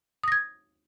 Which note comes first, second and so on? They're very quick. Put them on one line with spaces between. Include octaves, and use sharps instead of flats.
D#6 A#6 G#6